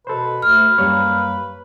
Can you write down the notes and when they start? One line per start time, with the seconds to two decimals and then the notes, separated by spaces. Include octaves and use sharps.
0.07 B2 A4 B4 C5
0.42 D2 F6
0.78 F#2 G3 A#3 C#5